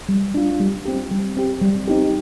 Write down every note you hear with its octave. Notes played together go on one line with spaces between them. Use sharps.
G3
D4 F4
G3
C4 G4
G3
C4 G4
G3
C4 D#4 G4